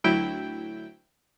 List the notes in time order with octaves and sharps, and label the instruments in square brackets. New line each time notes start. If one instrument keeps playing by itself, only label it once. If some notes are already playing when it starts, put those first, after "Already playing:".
[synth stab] D2 F#3 E4 G5